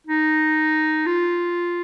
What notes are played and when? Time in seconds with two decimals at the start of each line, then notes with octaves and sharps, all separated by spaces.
0.07 D#4
1.07 F4